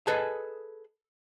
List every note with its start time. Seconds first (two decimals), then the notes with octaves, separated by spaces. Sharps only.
0.07 G#4 A4 B4 D#5 G#5 A5